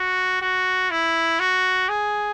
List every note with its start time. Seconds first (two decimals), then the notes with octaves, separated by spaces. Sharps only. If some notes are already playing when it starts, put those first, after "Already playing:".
Already playing: F#4
0.42 F#4
0.90 E4
1.40 F#4
1.89 G#4